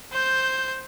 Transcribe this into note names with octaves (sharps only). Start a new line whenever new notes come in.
C5 G6